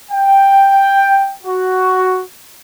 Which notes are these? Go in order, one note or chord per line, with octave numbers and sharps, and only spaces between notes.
G5
F#4